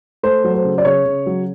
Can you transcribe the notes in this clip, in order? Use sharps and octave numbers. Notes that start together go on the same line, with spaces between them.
A3 C5
F#3
C5
C#3
D5
C#3 C#5
C#3
F#3